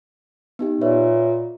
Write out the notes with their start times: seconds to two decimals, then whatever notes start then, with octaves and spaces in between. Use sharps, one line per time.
0.59 B3 D#4 G4
0.81 A#2 B4 C#5 E5